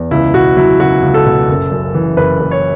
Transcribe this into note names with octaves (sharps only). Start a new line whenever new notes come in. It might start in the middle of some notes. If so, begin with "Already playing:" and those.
Already playing: E2
C#2 E4
B2 F#4
F#3 E4
C#2 F#4
C#2
A4
B2
F#1
F#2
E3
F#1 B4
F#1
C#5